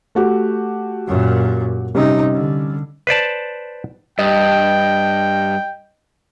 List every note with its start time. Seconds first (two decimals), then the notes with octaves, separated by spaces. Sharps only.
0.15 A3 F#4 G4
1.07 F#2 A#2
1.95 C3 G3 C#4 D#4
2.34 D3
3.07 B4 C5 D5 A5
4.19 G2 D#5 G5